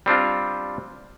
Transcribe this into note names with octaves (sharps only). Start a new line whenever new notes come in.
G3 C4 D4 F4